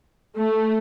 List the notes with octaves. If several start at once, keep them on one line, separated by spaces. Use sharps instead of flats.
A3